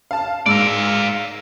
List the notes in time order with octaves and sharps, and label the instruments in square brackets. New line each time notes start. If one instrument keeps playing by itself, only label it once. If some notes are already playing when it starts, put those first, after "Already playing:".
[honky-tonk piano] F5 A5
[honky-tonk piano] G#2 E6 [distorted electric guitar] D5 F5